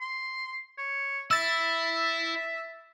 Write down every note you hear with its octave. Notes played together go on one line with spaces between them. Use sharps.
C6
C#5
E4 E5 E6 A6